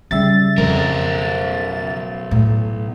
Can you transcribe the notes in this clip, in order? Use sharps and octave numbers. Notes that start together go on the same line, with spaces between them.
C#3 G3 E5 A6
B1 F2 A#4
A2